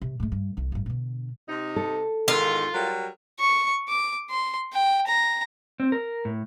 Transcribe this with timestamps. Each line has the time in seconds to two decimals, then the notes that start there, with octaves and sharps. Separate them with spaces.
0.02 C3
0.20 G#2 A3
0.32 G2
0.57 C2 E3
0.72 A1 G2
0.86 B2 D3
1.48 C3 D#4
1.76 A4
2.28 E2 G#2 D#3 F4
2.73 F#3 G3 A#4
3.40 C#6
3.88 D6
4.30 C6
4.73 G5
5.07 A#5
5.80 C4
5.92 A#4
6.25 A2